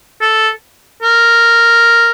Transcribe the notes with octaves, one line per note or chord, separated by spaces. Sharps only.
A4
A#4